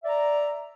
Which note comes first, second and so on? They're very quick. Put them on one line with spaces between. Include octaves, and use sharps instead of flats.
E5 D5 A#5